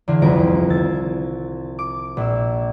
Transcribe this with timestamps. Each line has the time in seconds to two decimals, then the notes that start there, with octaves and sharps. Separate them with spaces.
0.08 E2 D3 G#4
0.22 D#1 C2 F2 A#4 D7
0.70 E6 G#6 A6
1.79 D6
2.17 A#1 E6